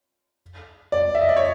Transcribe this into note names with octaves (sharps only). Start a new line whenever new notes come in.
D5
E5
D#5
D5
C#5